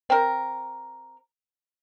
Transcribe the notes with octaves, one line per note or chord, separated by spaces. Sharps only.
C4 A#4